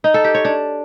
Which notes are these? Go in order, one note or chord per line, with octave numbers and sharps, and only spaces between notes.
D#4
A4
G4
C#5
D4